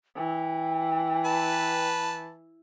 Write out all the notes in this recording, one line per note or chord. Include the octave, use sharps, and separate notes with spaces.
E3 G5
B4 A5